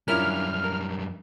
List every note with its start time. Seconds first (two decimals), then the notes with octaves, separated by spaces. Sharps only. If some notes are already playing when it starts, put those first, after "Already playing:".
0.08 F#2 G3 C#4 D4 E4 F4 A#4 F6
0.64 A#4